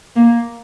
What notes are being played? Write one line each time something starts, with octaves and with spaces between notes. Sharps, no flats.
A#3